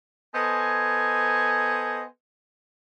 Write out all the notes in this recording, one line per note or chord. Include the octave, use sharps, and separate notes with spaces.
B3 A4 C5 D#5 G#5